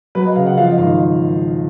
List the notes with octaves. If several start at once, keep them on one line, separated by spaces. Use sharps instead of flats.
F#3 B4
D#5
C#3 F5
F#5
F3 F5
D#5
G#1 F5